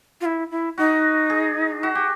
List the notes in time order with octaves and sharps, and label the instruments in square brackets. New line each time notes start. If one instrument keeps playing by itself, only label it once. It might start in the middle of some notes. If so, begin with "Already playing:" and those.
[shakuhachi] F4
E4
E4
[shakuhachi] D#4 [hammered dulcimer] F#4
[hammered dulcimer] G#4
F#4
G4